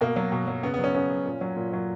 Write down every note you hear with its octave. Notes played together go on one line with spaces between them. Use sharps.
B2 A#3
F#3
B2
F#3
C#3 B3
B3
F#3
C#4
C#3 C#4
F#3
A#2
F#3
A#2
F#3